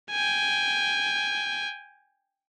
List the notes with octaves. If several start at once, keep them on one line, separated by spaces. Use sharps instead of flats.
G5 G#5